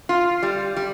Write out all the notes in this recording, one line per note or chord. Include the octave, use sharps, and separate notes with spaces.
F4
G3
G3